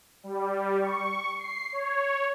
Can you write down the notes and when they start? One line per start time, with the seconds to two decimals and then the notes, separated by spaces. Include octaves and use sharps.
0.23 G3
0.79 C#6
1.39 C7
1.72 C#5